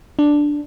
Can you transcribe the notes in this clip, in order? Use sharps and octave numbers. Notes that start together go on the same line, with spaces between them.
D4